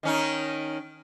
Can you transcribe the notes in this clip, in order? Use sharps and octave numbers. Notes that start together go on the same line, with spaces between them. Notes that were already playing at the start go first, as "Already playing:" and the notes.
D#3 C#4 D#4